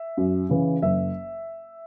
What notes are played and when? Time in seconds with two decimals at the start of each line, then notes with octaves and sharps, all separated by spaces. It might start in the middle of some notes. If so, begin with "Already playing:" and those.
Already playing: E5
0.17 F#2
0.49 C#3 E3
0.82 F#1 E5